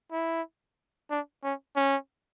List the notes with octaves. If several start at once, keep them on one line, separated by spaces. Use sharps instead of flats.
E4
D4
C#4
C#4